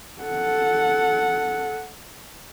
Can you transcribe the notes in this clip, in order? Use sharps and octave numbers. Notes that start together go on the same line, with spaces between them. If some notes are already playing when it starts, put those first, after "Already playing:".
A4 F#5